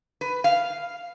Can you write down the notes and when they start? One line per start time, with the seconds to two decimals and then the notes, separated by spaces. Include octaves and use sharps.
0.21 B4
0.44 F5